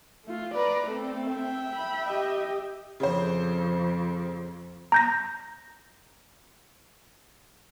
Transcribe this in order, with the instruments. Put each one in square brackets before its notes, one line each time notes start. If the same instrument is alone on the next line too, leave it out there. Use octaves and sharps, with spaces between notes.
[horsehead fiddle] A3 F4
[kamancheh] B4 [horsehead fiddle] D5 A#5
[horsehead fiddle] A3 C4 [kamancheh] A4
[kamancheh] E5 G5
[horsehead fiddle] B5
G4 D#5
[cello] F2 [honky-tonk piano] C#3 C5
[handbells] A#5 G6 A#6